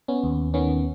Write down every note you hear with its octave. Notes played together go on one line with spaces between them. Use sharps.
B3 C#4
D#2
D#3 B3 C#4